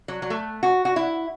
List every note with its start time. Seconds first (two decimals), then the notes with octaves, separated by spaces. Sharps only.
0.08 F#3
0.22 F#3
0.30 A3
0.63 F#4
0.85 F#4
0.96 E4